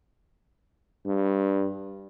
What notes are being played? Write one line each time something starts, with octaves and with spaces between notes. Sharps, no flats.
G2